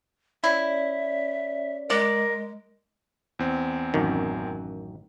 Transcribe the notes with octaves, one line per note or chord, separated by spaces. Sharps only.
C#4 E4 C#5 D5 E5
G#3 A#4 D5
E2 C4
A1 F#2 D#3